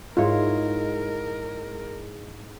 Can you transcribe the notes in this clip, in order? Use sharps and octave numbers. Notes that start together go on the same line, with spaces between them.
G#2 G#3 E4 F4 A#4 C#5